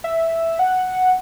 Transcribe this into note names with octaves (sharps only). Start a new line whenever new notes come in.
E5
F#5